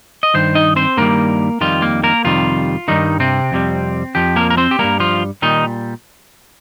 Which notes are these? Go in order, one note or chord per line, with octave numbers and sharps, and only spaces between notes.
D#5
G2 D#3 C5
D#4 D#5
C4 C5
G2 D#3 G3 A#3 A#4
F2 D#3 G3 F4
A#3
A#3 A#4
F2 C3 D#3 G3 F4
G2 D#3 G3 D#4
C3 C4
F2 C3 G3
F2 F3 G4
A#3 A#4
A#4
C4 C5
G4
G2 G3 A#3 A#4
F3 F4
A#2 D#3 G3 D#4